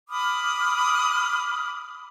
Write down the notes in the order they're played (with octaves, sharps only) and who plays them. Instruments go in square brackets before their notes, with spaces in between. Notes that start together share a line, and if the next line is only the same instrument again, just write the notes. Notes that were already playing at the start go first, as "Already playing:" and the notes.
[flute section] B5 D6 D#6 F6